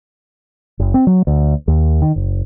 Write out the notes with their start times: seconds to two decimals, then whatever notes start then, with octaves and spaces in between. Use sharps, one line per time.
0.79 F#1
0.94 C4
1.07 F#3
1.27 D2
1.68 D#2
2.02 D#3
2.16 F#1